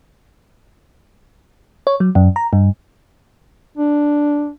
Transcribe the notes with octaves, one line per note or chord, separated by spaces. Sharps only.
C#5
F#3
F#2
A#5
G2
D4